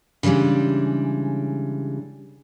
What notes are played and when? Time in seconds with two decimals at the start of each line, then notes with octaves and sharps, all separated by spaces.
0.23 C#3 E3 G3 G#3 D4